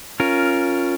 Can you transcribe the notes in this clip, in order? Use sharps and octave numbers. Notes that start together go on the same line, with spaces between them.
C#4 F4 A#4